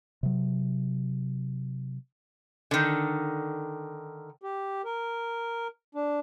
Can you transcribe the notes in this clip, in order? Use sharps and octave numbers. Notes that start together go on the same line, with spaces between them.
C3 F#3
D3 D#3
G4
A#4
D4